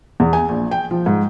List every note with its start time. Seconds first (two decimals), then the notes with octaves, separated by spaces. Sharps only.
0.20 E2
0.33 G#5
0.49 A#1
0.71 G5
0.91 F3
1.06 G#2